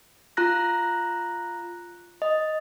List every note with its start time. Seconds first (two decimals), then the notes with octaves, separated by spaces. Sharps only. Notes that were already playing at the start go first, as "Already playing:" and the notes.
0.37 F4 A#5 F#6 A#6
2.22 D#5